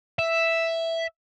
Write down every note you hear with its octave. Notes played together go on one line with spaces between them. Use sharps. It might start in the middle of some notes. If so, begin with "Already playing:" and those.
E5